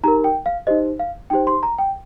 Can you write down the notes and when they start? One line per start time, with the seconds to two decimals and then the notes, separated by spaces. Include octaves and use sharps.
0.03 D#4 G4 A#4 A#5
0.24 G5
0.46 F5
0.67 D#4 G4 C5 D#5
1.00 F5
1.30 D#4 G4 C5 G5
1.47 C6
1.63 A#5
1.79 G5